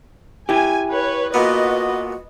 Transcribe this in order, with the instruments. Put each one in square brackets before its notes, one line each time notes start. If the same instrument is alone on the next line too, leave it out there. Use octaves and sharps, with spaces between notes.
[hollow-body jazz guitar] E4 G4 [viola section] G#5
[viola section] B4 C#5
[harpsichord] A#2 B3 [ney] F#4 [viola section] B4 D#5